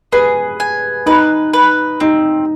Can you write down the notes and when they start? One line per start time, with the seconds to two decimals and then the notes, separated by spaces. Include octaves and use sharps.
0.12 G#4 B4
0.60 G#5
1.06 D#4 B4
1.54 B4
2.00 C4 D#4